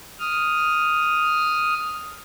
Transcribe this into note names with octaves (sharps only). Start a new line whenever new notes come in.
D#6 F6